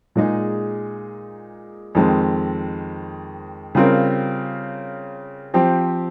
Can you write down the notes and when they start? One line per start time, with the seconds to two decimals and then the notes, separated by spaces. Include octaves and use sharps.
0.15 A#2 G#3 D#4 G#4
1.95 F2 D#3 G#3 C4
3.75 C#3 G3 C4 F4 A#4
5.54 F3 C4 G4